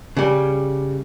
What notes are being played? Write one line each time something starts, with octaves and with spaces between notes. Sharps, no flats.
C#3 G3